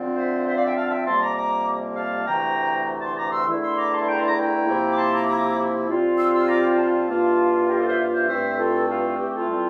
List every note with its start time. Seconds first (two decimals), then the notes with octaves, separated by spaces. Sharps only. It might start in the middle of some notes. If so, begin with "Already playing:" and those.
Already playing: D3 F3 C4 F4
0.16 C5 E5
0.47 C5 E5
0.56 D5 F5
0.66 E5 G5
0.76 F5 A5
0.91 E5 G5
1.07 F2 C3 G3 A#3 A5 C6
1.22 A#5 D6
1.37 A#5 D6
1.96 F5 A5
2.27 D2 C3 E3 A3 E4 G5 A#5
3.02 A5 C6
3.17 A#5 D6
3.32 C6 E6
3.47 E2 D3 A3 E4
3.62 C6 E6
3.77 A#5 D6
3.92 A5 C6
4.07 G5 A#5
4.18 A5 C6
4.27 A#5 D6
4.38 G5 A#5
4.68 C3 F3 A#3 E4
4.91 D6
4.97 A5 C6
5.13 A#5 D6
5.27 A#5 D6
5.88 C3 G3 C4 F4
6.18 C6 E6
6.33 C6 E6
6.48 A#5 D6
6.63 G5 A#5
6.78 F5 A5
7.08 G2 E3 A#3 F4
7.68 G4 A#4
7.78 A4 C5
7.88 C5 E5
8.14 C5 E5
8.28 G2 E3 A3 C4 C5 E5
8.58 F4 A4
8.89 F4
9.18 G4
9.34 F4 A4
9.49 E3 G3 C4 E4